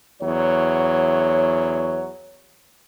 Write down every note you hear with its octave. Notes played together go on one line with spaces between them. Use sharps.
E2 F#3 C#5